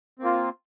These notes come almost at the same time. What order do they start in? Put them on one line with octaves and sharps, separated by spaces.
C4 A#3 F4